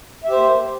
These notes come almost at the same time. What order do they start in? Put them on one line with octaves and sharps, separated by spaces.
E5 G4 C5 A#3